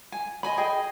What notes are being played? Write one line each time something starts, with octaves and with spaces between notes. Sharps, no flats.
G#5
D#5 G#5 B5
G#4 D#5 G5